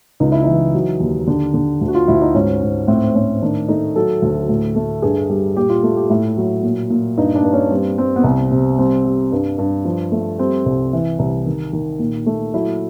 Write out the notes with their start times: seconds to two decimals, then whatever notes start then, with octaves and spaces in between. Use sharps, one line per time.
0.20 C#2 D#4
0.32 E4
0.43 E3 D#4
0.74 F#3
1.00 D#2
1.27 D3
1.54 D3
1.81 D2
1.88 F#4
1.95 F4
2.08 D2 E4
2.21 D#4
2.34 G#2 C#4
2.62 G#2
2.88 A2 C4
3.15 A2 C#4
3.42 D#3 D4
3.68 A3 D#4
3.96 F#3 A4
4.22 D2
4.49 A2
4.75 A3
5.02 G2 G#4
5.30 G3
5.56 A#2 G4
5.70 F4
5.83 A3 G4
5.96 G4
6.10 A2 E4
6.37 F#3
6.63 A#2
6.90 A#2
7.18 G2 D#4
7.35 D4
7.44 G2
7.53 C#4
7.71 G3 C4
7.98 G3 C4
8.16 B3
8.24 C2 C4
8.51 C3 C4
8.78 G3 C4
9.05 G3
9.32 G2
9.58 G2
9.85 F3
10.12 A3
10.39 G3 C4
10.66 C2
10.93 E3
11.19 C2
11.46 D#3
11.73 D#3
11.99 A#2
12.26 A3
12.54 F#3 E4